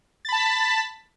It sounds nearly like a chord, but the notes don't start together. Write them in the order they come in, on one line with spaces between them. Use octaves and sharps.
A6 B5 A5 B6